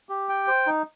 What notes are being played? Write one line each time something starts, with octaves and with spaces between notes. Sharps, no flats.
G4
G5
C5
D#4